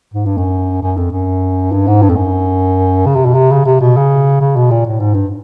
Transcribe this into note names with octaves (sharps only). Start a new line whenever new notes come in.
G#2
G2
F#2
F#2
F2
F#2
G2
G#2
G2
F2
F#2
C#3
C3
B2
C3
C#3
C3
B2
C#3
C#3
B2
A#2
A2
G#2
G2